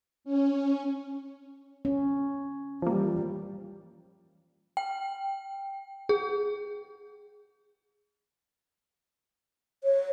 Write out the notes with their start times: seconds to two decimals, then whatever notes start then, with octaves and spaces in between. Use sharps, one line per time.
0.24 C#4
1.85 C#4
2.82 E3 F3 G3 A#3
4.77 G5
6.09 G#4
9.84 C#5